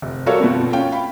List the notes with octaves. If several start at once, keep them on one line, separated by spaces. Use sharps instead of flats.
F1
G3 F#4 A4 A#4 C#5 F5
B2 F3 A3 B3 C4
C#4 F4 G5
F5 B5